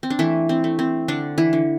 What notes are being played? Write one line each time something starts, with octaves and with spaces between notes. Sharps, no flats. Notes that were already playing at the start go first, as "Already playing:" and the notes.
C4
D4
E3 A3 E4
C4
A3
C4
D3 D4
E3 E4
D3